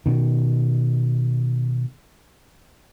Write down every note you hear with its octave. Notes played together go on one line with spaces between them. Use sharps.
B2 D#3